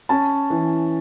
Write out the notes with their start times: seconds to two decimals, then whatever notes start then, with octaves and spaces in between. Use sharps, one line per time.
0.09 C#4 A5
0.50 E3